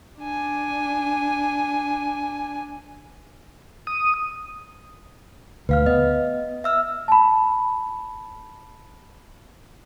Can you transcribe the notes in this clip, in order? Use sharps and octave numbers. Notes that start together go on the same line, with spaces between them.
D4 G#5
D#6
D2 B4 F5 F6
B3 D#5
E5 E6 F6
A5 B5